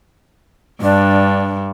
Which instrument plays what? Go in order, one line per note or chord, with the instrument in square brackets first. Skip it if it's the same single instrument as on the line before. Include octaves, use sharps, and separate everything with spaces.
[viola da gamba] G2 [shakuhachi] D4